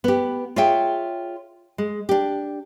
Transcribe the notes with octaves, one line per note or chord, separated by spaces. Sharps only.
B3 G4
F4 G#4 C#5 E5 G5
G#3
D4 G4